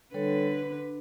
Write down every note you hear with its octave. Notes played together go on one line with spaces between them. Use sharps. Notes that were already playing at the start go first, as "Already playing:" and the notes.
D3 G3 A4 B4 C#5
D4